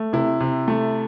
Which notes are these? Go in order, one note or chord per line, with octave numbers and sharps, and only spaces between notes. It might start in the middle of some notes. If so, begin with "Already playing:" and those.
Already playing: A3
C3 E4
C3
A3